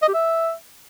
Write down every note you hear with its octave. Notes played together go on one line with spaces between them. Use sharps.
D#5
G4
E5